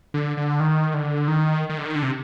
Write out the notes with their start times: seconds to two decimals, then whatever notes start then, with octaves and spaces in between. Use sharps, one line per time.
0.14 D3
0.37 D3
0.60 D#3
0.94 D3
1.28 D#3
1.70 D#3
1.78 D3
1.86 D#3
1.96 D3
2.03 C3